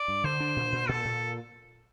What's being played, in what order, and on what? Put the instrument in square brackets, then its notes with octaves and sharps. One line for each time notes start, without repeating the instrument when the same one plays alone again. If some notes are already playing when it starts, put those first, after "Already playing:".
Already playing: [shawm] D5
[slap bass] G2
[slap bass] D3 [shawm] C5
[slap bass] D4
A#2
A#2
[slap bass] A#2 [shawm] A4
[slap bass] A#2